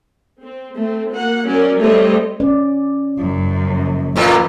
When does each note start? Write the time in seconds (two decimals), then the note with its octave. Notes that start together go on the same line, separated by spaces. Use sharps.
0.42 C4
0.76 A3 C4
1.13 A#3 F#4 F#5
1.46 F#3 C#4 A#4 D5
1.80 G3 A3 C4 C#5 D#5
2.40 C#4 D5
3.19 F#1 F#2
4.16 F2 A2 E3 A#3